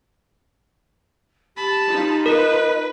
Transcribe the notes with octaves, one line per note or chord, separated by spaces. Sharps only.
G4 A5 B5
D#4 F4
A#4 B4 D#5